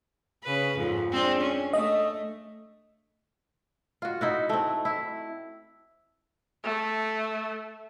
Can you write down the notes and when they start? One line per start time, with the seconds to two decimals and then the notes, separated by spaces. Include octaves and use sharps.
0.44 C#3 B4
0.77 F2 G#2
1.10 G#3 C4 D4
1.42 C#4
1.73 A3 D#5
4.02 F4 F#4
4.21 D#4 E4 F#4
4.49 A3 C4
4.85 E4
6.64 A3